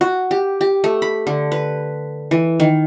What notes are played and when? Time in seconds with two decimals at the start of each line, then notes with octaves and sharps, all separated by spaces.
0.01 F#4
0.31 G4
0.61 G4
0.84 A3
1.02 B5
1.27 D3
1.52 B4
2.31 E3
2.60 D#3